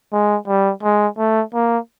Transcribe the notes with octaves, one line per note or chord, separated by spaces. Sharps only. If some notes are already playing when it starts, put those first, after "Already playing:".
G#3
G3
G#3
A3
A#3